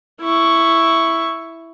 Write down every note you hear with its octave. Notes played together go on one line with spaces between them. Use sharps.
E4 C#6